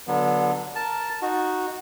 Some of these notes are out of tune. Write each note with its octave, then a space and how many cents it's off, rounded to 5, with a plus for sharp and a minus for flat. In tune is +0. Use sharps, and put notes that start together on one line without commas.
D3 +0 F#3 +0 B3 -30
A#4 +0 A5 +0
D#4 +0 F#4 -5